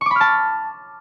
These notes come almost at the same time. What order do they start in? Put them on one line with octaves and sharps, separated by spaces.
C#6 D6 B5 F6 A5